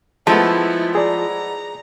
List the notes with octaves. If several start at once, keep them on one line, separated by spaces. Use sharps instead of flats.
F3 G#3 A3 B3 E4 A5
G#4 D5 A#5